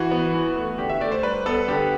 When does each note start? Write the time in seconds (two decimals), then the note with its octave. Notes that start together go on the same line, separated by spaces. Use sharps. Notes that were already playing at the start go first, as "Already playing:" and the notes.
Already playing: E3 F#4
0.11 B3
0.34 E3
0.56 A3
0.78 D3 G4
0.89 E5
1.01 A3 D5
1.12 C5
1.23 G3 B4
1.46 B3 A4
1.68 D3 G4